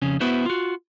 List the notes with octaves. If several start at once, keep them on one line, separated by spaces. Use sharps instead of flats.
F2 C#3 C#4
B3 E4 F#4 B4 C5
F4 F#4